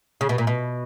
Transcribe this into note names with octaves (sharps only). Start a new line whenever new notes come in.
C#3
B2
A#2
B2